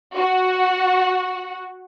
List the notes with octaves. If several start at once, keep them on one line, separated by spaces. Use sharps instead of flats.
F#4 F#5